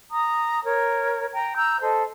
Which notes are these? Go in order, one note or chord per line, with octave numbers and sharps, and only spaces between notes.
A#5 D#6
A#4 C#5
G5 A#5
A#5 E6 G6
A4 C5 D#5